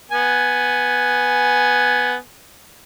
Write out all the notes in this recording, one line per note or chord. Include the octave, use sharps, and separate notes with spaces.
B3 G#5